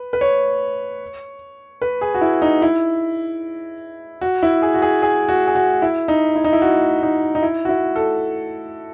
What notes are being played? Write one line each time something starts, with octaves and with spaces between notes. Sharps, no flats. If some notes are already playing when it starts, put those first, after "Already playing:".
Already playing: B4
B4
C#5
B4
G#4
F#4
E4
D#4
E4
F#4
E4
G#4
F#4
G#4
G#4
F#4
G#4
F#4
E4
D#4
E4
D#4
E4
F#4
D#4
D#4
E4
F#4
E4
A4